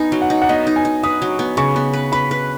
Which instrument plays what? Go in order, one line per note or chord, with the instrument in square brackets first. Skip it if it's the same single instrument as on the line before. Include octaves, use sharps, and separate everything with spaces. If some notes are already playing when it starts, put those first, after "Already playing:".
Already playing: [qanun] B3 D#4 [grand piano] G#5
[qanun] F#3
[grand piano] F#5
[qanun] D#4
[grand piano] F#5
[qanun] B3 [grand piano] D#5
[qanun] D#4
[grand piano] G#5
[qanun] D#4
[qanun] B4 [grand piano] D#6
[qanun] F#3
B3
[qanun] C#3 [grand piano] C#6
[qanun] B3
B4
[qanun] B4 [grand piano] B5
[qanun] B4